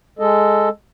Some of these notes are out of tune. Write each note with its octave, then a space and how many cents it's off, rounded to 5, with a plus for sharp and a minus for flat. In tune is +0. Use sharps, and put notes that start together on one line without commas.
G#3 +0 A4 +0 D#5 +0